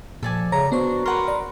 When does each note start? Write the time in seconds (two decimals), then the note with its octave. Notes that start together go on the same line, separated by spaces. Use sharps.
0.23 A#2 F3 A4 D5 G#5
0.52 C#3 C#5 A#5
0.72 B3 D4 F#4 C5
1.06 A#4 B4 F#5 C6 F6
1.28 D5 A#5